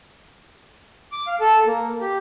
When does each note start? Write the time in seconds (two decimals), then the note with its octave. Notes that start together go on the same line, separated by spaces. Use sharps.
1.12 D6
1.27 F5
1.40 A4
1.66 A#3
2.01 G4